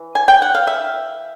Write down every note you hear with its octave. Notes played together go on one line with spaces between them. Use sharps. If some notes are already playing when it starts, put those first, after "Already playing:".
Already playing: E3
G#5
G5
F#5
F5
E5